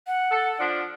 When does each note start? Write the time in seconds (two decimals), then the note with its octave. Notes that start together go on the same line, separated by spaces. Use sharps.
0.07 F#5
0.31 A4
0.59 F3 D4